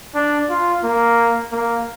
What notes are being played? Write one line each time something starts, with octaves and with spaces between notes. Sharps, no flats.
D4
F4
A#3
A#3